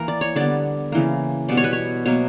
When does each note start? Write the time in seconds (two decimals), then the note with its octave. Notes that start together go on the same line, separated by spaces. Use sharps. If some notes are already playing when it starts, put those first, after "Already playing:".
Already playing: E3 A#3 A#4
0.08 D5
0.21 C#5
0.36 D3 G3 B3 D5
0.92 C#3 E3 A#3
1.49 B2 G3 B3 D5
1.57 C#5
1.64 B4
1.73 C#5
2.05 B2 F#3 A#3 C#5